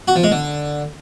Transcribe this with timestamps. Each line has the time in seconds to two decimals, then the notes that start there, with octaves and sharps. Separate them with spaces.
0.08 F#4
0.16 F3
0.24 G#3
0.32 D3